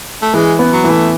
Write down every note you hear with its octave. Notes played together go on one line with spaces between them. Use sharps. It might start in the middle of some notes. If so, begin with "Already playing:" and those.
A3
E3 G#3
B3
F#3
E3
A3